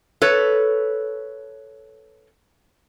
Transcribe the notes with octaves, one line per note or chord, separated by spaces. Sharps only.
A4 B4 C#5